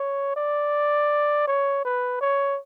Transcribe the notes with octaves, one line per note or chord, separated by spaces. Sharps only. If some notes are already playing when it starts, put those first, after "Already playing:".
Already playing: C#5
D5
C#5
B4
C#5